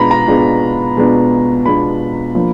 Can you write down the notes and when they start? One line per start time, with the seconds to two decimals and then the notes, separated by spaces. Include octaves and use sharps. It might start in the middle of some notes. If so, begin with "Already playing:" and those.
Already playing: B2 G#3 B3 D4 F4 A#5 B5
0.11 A#5
0.28 B2 G#3 B3 D4 F4
0.97 B2 G#3 B3 D4 F4
1.66 B2 G#3 B3 D4 F4 B5
2.35 F3 A#3 D4 F4